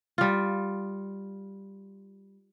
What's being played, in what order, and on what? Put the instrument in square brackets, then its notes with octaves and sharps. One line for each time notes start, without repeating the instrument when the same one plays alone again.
[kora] G3 F4